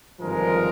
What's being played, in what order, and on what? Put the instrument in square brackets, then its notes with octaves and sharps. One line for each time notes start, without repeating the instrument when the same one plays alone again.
[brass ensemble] G#1 G2 D3 F3 G#3 A#4